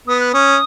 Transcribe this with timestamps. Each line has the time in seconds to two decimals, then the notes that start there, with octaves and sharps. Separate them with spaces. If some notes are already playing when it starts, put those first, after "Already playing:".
0.08 B3 D#6
0.20 F#6
0.32 C#4 D#6